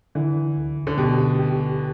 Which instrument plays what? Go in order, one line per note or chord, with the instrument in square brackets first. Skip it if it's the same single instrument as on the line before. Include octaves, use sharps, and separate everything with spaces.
[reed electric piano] D3 [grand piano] E3
[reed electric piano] D2
[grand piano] D3
[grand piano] B2 [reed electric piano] G4
[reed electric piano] G4